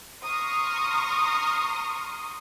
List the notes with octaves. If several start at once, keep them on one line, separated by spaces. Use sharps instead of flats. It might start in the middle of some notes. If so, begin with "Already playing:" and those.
A#5 C6 C#6 D#6 F6